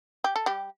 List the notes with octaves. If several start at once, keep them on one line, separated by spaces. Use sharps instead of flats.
G4
A4
G3 G4